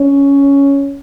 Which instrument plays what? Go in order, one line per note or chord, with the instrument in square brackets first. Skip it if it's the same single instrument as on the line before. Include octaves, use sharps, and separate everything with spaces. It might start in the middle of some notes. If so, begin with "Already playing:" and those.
Already playing: [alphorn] C#4